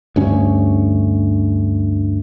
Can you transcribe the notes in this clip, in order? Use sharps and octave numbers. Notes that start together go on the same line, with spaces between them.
D2 G2 C#4